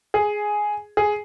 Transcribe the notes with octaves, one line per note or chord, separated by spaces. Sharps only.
G#4
G#4